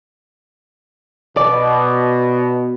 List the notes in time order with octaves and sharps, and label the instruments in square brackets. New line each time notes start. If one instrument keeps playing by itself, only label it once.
[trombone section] B2 [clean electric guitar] D5